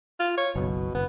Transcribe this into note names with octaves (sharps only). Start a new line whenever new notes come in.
F4
C#5
F#1 B1 B2
F#1 B3